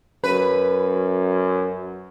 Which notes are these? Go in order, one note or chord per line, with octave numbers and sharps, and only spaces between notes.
F#2 B4